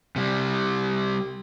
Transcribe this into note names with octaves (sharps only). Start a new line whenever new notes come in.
C3 G3